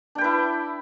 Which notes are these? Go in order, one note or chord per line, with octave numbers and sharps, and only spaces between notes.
D4 E4 B4 G5